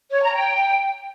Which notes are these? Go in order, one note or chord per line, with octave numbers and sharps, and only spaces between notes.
C#5
A#5
G5